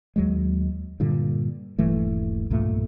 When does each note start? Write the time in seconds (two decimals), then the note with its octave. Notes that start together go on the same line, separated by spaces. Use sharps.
0.16 D#2 F#3 G#3
1.00 G2 A#2 D3
1.79 D#1 G2 E3 A3
2.50 B1 G2 A#2 A3